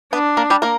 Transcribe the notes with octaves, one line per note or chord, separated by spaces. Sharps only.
B3 D4 B4
A#3 A#4
G3 G4
A#3 A#4